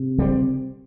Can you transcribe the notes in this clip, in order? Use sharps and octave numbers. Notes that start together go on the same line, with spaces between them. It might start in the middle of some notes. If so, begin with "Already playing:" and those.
Already playing: C3
C#3 G3 C4